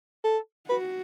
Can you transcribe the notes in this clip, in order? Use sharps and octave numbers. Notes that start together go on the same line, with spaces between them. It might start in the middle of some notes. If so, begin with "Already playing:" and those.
A4
F#4 B4